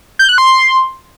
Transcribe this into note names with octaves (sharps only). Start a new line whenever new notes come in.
G6
F#6
C6